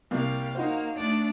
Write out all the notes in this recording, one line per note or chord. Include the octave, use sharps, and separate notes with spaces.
C2 C3 G3 A#3 F5
A#3 D#4 F#4 C5
D2 D4 D5